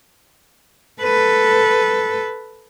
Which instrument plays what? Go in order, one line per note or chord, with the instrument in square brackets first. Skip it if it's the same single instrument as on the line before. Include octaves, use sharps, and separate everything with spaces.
[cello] A4 B4